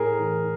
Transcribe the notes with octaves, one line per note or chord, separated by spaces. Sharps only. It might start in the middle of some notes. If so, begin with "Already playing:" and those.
Already playing: A2 G#4 A#4
E3